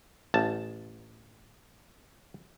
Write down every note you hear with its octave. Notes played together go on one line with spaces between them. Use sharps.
A1 A5